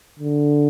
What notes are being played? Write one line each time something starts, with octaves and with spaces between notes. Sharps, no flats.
D3